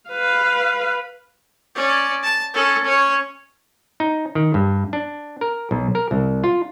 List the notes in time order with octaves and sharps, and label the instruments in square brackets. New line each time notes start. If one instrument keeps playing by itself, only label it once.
[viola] B4 F5
[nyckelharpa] C#4 D5
A5
C#4 A4
C#4 C#5
[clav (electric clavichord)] D#4
D#3
G2
D4
A#4
B1
A#4
C2
F4